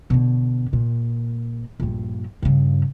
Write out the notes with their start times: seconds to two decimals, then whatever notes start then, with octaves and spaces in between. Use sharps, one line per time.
0.10 B2 D3
0.73 A#2
1.80 A#1 G2
2.42 G2 C#3